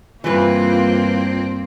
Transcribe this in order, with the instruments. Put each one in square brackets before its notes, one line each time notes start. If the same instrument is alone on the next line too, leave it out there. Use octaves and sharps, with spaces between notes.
[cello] G2 C4 [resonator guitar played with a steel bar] E3 B4 [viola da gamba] A#3 [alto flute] F4